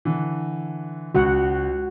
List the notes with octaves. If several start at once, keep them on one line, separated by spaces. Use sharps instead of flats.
D3 E3
C#2 F#4 F#5